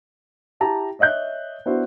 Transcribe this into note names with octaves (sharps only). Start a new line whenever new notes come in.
E4 G4 A5 A#5
C#5 D#5 E5 F#6 G6
B3 D4 E4 F#4 C5